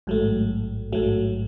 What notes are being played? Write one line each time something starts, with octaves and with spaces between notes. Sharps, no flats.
A1 G#2 F#3 A3
A1 G#2 F#3 A3